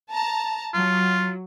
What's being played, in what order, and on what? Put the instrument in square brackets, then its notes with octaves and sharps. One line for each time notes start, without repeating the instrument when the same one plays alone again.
[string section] A5 A#5
[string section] F#3 [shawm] F4